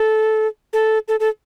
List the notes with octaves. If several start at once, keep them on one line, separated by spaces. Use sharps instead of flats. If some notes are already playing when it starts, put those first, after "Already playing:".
Already playing: A4
A4
A4
A4